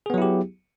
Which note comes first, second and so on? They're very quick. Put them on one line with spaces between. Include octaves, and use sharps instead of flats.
G#4 B3 F#3 E4 G4